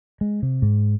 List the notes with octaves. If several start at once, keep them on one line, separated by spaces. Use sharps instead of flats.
G#3
C3
G#2